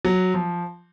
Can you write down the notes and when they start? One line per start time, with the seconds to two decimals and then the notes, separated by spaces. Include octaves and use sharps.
0.05 F#3
0.34 F3